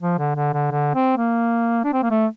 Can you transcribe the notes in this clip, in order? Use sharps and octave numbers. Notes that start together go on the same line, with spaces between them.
F3
D3
D3
D3
D3
C4
A#3
D4
C4
A#3
A3